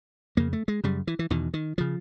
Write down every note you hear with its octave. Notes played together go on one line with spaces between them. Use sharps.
F2 C#3 A#3
A3
G#3
F#2 C#3 G3
E3
E3
E2 B2 D#3
D#3
C#3 F3